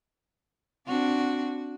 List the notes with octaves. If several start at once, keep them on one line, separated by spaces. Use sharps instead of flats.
C4 D4 F#4